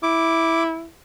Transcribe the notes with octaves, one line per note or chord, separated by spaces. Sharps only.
E4 D6